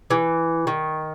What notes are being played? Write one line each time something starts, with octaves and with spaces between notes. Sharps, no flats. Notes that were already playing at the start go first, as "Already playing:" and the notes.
E3
D#3